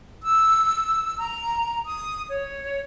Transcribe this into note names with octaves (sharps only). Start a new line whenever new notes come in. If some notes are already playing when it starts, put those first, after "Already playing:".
E6
A#5
D#6
C#5